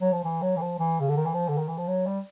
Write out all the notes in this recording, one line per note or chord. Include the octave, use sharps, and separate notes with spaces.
F#3
F3
E3
F#3
E3
F3
E3
C#3
D3
D#3
E3
F3
D3
D#3
E3
F3
F#3
G3